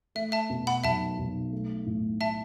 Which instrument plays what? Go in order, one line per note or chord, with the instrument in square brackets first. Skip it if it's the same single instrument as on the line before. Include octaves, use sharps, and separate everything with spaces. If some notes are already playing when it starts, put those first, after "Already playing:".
[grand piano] A3 [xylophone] E5
[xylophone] E5 A5
[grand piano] B2
[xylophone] F#5 B5
[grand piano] B1 [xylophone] E5 A5
[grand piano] B1
A3
A2
[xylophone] E5 A5